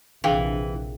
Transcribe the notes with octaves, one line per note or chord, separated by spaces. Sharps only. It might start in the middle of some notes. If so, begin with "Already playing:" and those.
A#1 C3 E3 D4 G#4 F5 G5